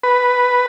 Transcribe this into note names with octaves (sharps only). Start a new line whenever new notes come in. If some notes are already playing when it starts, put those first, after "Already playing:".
B4